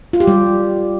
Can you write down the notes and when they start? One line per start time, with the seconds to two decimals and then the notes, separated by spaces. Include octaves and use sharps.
0.13 F4
0.20 G4
0.27 G3